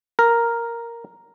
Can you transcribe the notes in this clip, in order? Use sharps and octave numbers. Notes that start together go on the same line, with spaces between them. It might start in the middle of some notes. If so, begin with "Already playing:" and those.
A#4